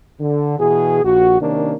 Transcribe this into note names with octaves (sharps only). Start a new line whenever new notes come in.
D3
B2 E3 G#4
A#1 F#4
C3 D#3 A#3 C#4 D4